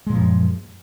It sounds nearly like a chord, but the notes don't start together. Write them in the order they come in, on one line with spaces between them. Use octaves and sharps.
G#3 A#2 F3 F#2